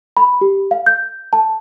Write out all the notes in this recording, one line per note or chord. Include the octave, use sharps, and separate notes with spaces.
B5
G4
F5
G6
A5